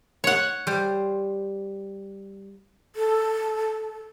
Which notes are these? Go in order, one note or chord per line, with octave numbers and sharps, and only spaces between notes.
C#5 F#5
G3 C5
A4